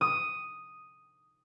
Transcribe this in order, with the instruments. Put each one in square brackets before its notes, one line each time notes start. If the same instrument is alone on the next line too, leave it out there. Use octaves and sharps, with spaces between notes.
[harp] D#6